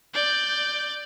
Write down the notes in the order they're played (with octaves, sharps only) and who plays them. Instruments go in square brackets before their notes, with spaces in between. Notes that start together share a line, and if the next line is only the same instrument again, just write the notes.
[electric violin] D5 G6